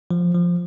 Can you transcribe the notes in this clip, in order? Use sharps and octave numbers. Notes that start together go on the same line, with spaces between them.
F3
F3